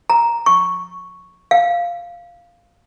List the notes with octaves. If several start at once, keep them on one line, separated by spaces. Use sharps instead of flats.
A#5
C#6
F5